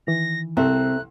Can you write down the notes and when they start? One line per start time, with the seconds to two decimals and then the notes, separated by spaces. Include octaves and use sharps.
0.07 D#3 E3 A#6
0.57 C2 C4 A4 E5 A#5 F#6